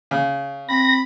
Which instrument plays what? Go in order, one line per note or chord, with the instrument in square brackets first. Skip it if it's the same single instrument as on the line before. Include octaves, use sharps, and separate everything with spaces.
[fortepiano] C#3
[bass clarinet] C4 [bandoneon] B5 [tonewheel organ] A#6